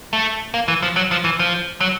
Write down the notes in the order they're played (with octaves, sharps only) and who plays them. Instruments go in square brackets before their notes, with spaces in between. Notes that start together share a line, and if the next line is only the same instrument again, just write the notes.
[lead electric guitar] A3
A#3
E3
F3
F#3
F3
E3
F3
F#3